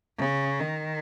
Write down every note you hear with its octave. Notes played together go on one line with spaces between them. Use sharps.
C#3
D#3